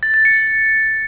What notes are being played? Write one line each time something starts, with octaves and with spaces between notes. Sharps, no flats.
A6
A6
C#7